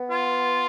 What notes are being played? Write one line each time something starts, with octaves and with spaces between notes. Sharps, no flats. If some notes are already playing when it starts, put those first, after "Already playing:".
Already playing: B3
F4